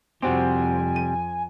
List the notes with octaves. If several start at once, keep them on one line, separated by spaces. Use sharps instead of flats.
F2 C3 G3 C4 F#4 G4 G#5
D#7